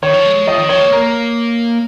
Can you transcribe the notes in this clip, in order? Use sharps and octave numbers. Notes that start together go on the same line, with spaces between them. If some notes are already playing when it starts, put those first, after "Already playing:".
D#3 C#5
F3
G#3
G#3
F3 D#5
D#3
F3 C#5
A#3
A#3 A#4